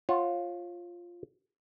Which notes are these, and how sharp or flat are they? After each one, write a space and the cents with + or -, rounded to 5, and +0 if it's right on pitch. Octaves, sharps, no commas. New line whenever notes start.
F4 +0 C#5 -35 F#5 +0